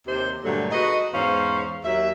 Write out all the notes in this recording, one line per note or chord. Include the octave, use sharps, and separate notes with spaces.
D#2 C3 C5
G2 A#2 D3 F#3 G3 A3
D#4 F#4 G#4 A4 B4 D#5
E2 G#2 C#4 C5 F5
D#2 F#3 E5